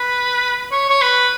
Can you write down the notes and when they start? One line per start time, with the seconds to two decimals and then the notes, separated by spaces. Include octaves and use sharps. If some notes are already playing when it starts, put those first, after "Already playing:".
Already playing: B4
0.71 C#5
0.89 C#5
1.01 B4